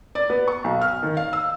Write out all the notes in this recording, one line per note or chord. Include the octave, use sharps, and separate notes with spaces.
D5
B3
C#6
B1
F6
D#3
F5
E6